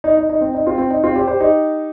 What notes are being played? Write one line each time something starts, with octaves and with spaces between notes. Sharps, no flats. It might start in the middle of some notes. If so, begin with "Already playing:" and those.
D#4
D#4
D#4
C4
D#4
C4 F4
C4
D#4
C4 F4
G4 C5
G4 C5
D#4 G4